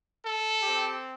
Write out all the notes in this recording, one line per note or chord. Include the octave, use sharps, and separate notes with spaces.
A4
C4 G4